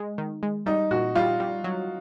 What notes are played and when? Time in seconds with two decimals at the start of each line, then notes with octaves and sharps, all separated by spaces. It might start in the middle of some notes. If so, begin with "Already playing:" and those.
Already playing: G#3
0.18 D#3
0.43 G#3
0.66 G3 D#4
0.91 A#2 F#4
1.15 G3 F4
1.40 G3
1.64 F#3